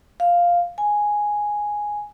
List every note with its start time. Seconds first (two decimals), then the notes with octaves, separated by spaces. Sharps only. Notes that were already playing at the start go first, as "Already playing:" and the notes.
0.20 F5
0.78 G#5